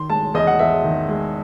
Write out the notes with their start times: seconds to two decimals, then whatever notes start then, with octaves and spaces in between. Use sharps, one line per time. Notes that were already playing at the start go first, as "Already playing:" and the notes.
Already playing: D#3 C6
0.10 G#3 A5
0.34 E2 D#5
0.47 F#5
0.59 E2 E5
0.84 D#3
1.09 G#3